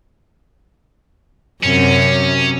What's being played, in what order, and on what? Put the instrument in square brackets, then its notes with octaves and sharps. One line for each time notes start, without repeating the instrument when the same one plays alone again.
[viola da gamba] F#2 C3 [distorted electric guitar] C#4